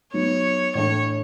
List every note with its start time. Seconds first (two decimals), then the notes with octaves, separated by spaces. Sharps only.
0.13 F#3 B3 D#4 C#5
0.75 A2 E3 A3 D4 C#5